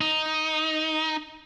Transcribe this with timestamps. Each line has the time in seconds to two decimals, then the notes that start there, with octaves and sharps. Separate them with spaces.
0.01 D#4